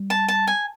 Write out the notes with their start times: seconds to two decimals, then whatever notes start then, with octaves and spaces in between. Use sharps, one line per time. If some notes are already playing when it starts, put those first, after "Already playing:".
Already playing: G3
0.10 A5
0.28 A5
0.47 G#5